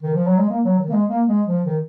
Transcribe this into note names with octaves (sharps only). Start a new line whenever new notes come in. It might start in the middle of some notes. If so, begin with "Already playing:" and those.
D#3
F3
F#3
G#3
A#3
F#3
D#3
A#3
G#3
A#3
G#3
F3
D#3